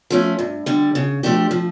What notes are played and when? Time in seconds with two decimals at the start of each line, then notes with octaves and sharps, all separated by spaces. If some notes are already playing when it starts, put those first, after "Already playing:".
0.10 F3 A3 C#4
0.39 G2
0.66 D3 G3
0.95 C#3
1.23 F3 A3 D4 G4
1.51 F3